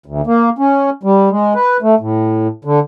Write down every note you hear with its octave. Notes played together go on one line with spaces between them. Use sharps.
D2
A#3
C#4
G3
G#3
B4
A3
A2
D3